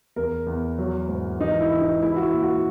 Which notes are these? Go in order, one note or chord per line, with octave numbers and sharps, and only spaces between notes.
E2 A#4
E2
F#3
G#2
E3 D#4
E4
E3
D#4
G#3 E4
F#4
E4
A#2
F#4